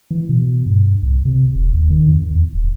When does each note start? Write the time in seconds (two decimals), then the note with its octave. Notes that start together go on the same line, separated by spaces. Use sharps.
0.11 E3
0.29 B2
0.66 G2
1.02 C2
1.25 C3
1.55 E1
1.73 D#2
1.90 D#3
2.08 F2
2.31 E2
2.54 D1